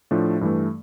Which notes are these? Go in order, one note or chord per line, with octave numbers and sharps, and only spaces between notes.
A2 F3 A3 D4
G2 E3 A3